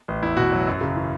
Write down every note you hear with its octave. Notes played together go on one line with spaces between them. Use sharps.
A1
E2 E4
B2 F#4
F#3
F#2
C#3
E3